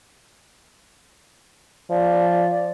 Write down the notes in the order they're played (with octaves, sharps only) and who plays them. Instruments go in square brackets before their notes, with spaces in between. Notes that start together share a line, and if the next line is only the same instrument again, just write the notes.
[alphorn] F3 [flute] D5